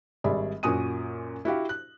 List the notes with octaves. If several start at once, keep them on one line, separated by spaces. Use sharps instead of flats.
G#1 G3 G#4 D5 E5 B5
F#2 A#2 F#4 G#5 D#6 D#7
E4 F#4 G4 F5
F#6